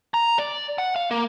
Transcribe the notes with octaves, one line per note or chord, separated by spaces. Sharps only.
A#5
D5
F#5
F5
A#3